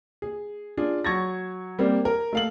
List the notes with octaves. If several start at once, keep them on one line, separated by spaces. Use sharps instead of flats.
G#4
D4 F4 G#4
F#3 C#6 G#6 A#6
G3 A#3 C4
A#4
A3 F5 F#7